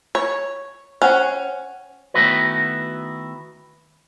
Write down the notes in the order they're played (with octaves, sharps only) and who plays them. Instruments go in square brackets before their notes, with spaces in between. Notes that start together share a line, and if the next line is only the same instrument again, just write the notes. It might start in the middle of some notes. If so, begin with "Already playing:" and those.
[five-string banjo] C#5
[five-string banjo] C#4 [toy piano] C5 F#5 G5
[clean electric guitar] D#3 A3 B3 E4 F#4 B4